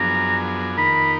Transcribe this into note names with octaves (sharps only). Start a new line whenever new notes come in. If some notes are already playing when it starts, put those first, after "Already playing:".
Already playing: F#2 F3 B3 D4 G#4 A#5
F2 D#3 A#3 D#4 A#4 B5